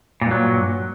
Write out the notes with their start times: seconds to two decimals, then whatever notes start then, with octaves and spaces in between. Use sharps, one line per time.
0.21 A#2
0.26 G2
0.31 F#3